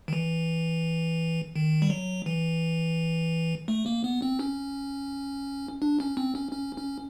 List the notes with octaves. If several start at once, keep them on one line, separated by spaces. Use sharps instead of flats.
D#3
E3
D#3
G3
F#3
E3
A3
A#3
B3
C4
C#4
D4
C#4
C4
C#4
C#4
C#4